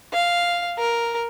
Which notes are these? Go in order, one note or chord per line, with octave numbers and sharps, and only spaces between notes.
F5
A#4